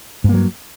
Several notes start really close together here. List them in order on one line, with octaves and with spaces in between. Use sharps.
G2 A#3 F#3